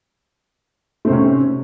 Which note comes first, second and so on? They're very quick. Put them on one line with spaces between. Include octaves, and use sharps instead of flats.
A3 C4 C3 C#4